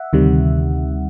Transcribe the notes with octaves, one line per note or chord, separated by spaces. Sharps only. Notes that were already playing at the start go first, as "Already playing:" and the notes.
Already playing: E5 F#5
D2 C3 D#3 G3